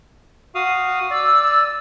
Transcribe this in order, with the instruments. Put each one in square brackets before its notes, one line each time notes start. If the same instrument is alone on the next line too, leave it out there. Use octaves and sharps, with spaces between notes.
[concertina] F#4 F5 D#6
[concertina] D5 [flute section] E6